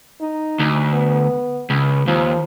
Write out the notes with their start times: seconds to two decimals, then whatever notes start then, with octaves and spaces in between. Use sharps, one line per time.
0.21 D#4
0.59 D2
0.93 B3
1.70 C#2
2.08 D#2 F3